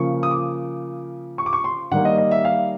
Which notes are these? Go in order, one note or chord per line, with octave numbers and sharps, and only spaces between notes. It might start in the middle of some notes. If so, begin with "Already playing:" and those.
Already playing: C#3 F3 A#3 C#6
D#6
D6
C#6
D6
C#6
C6
D#3 G3 A#3 F#5
D#5
D#5
E5
F5